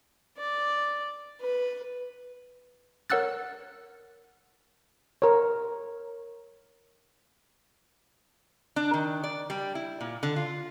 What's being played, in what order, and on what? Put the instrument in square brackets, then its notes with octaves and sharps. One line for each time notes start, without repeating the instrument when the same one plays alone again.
[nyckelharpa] D5
B4
[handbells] A#4 C#5 F#5 E6 F#6 A6
[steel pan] A#4 C#5
[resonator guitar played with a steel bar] D4
D#3
D5
G3
E4
A#2
D3
F4